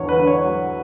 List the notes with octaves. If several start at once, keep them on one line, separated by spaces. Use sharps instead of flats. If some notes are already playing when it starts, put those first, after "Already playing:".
Already playing: E2 D3 F#3 C#5
B4
D3
C#5
F#3